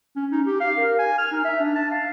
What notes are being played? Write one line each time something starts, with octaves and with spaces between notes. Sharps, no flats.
C#4
D#4
G4
F5
A#4
G#5
F6
D#4
E5
D4
A5
F5